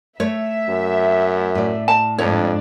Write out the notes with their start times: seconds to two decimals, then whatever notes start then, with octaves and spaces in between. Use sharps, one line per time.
0.20 A3 C#5 E5
0.69 F#2
1.55 A2 D5
1.88 A5
2.18 F2 G#2 D4 C#5